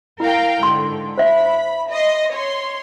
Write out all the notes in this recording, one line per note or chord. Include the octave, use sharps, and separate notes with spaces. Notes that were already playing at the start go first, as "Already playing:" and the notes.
E4 A#4 F5 G5
G#2 D3 C6
C5 E5 B5
D#5 C6
C#5 C6